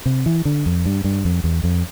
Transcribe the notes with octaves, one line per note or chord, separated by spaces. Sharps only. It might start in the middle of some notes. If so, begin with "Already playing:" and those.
C3
E3
D3
F2
G2
G2
F2
E2
F2